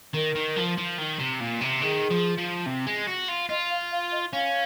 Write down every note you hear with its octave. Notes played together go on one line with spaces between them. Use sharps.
D#3 A#4
D#3
F3
F3
D#3
C3
A#2
C3
D#3 G#4
F3
F3
C3
G#3
F#4
F4
F4 D#5
F5
F5
D#5
C#4 F5